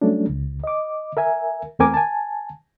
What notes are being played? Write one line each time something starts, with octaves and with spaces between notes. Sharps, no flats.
F#3 G3 A3 C#4 D4
C#2
D#5 D6
A#4 E5 G#5
E2 A3 C4 A#4 G#5 D6
G#5 A5